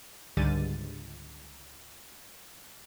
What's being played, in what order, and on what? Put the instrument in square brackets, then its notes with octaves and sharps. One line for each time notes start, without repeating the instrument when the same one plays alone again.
[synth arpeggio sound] C#2 G#2 D3 G3 A6 D#7